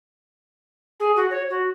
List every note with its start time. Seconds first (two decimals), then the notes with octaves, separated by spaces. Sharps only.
0.99 G#4
1.16 F#4
1.30 C#5
1.49 F#4